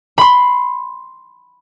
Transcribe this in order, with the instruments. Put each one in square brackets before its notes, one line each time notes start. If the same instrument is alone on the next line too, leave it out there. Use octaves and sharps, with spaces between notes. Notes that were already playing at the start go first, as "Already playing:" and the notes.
[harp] B5 C6